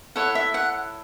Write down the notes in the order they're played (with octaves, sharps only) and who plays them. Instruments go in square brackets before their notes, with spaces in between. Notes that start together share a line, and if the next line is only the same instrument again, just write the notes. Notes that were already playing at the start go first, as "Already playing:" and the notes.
[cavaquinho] E4 A4 C#5 F#5
E5
F#5